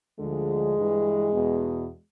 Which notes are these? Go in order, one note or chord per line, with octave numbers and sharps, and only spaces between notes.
D2 D3 F3 G#3
G2 E3
E2 B2